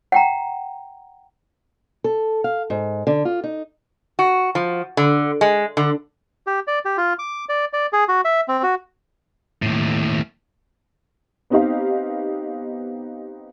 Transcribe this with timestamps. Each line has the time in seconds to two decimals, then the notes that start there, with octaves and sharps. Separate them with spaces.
0.12 F#5 G5 A#5
2.04 A4
2.44 F5
2.70 G#2
3.07 D3
3.25 F4
3.44 D#4
4.19 F#4
4.55 F3
4.97 D3
5.41 G#3
5.77 D3
6.47 G4
6.67 D5
6.85 G4
6.97 F4
7.19 D6
7.49 D5
7.73 D5
7.93 G#4
8.08 F#4
8.25 E5
8.48 C4
8.63 F#4
9.62 D#2 A2
11.50 B3 C4 D#4 G4 D#5 F5